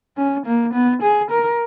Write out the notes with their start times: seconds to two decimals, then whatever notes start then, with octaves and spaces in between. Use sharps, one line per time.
0.17 C#4
0.46 A#3
0.73 B3
1.02 G#4
1.31 A#4